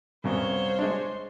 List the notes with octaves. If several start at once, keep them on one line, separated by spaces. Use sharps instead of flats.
C2 F#2 G3 B3 C5 C#5 F5
G#3 D4 C6